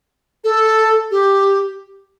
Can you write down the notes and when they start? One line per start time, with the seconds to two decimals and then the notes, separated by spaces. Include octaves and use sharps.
0.44 A4
1.11 G4